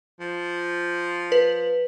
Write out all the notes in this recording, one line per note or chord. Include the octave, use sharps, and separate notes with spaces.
F3
B4